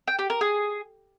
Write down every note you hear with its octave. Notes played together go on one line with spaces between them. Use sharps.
G5
G4
A#4
G#4